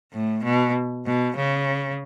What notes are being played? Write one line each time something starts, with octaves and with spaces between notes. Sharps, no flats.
A2
B2
B2
C#3